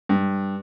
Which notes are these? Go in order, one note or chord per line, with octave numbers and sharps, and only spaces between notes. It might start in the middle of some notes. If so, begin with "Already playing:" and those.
G2